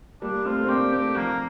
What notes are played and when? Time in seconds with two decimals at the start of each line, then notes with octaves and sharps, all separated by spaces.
0.22 G3 A#3 D4
0.45 A3 C4 F4
0.64 C4
0.69 A#3 D4 G4
0.93 A3 C4 G4
1.17 F3 A#3